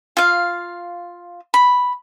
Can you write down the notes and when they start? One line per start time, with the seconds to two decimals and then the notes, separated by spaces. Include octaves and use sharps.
0.17 F4 F5
1.54 B5